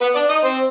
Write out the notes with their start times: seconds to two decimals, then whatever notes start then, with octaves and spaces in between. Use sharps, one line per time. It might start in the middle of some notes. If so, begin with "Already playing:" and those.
0.01 B3 B4
0.15 D4 D5
0.29 D#4 D#5
0.44 C4 C5